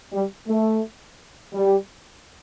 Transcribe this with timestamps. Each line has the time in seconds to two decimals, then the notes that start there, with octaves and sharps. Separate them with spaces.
0.12 G3
0.48 A3
1.53 G3